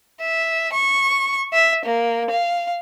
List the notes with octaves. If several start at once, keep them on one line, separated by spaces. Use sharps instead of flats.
E5
C#6
E5
A#3
F5